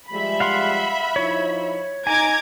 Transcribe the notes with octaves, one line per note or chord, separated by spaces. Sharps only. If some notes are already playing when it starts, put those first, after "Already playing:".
F3 G3 G#3 E5 B5
F5 F#5 C6
F3 D#4 E4 C#5
D#4 G#5 A#5 D6 G#6